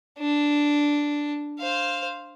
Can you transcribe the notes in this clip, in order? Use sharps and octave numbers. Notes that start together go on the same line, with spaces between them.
D4
C5 F5